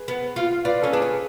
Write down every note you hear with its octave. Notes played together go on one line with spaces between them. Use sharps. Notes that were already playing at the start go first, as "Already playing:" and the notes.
Already playing: G#4 B4
B3
F4
F4 B4 D5
C#4 A4
D4 G#4 B4
C#4